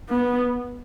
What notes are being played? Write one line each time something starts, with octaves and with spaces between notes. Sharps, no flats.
B3